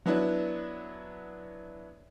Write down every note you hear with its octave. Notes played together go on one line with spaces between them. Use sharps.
F#3 B3 D4 E4